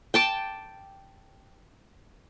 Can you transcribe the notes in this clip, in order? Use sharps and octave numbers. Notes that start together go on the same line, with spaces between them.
G5 A5 D6